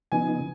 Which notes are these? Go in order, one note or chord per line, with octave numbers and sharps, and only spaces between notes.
C#3 F3 B3 D#4 G#5